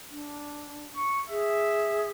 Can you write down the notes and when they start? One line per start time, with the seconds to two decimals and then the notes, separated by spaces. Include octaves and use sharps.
0.10 D4
0.97 C#6
1.30 G#4 E5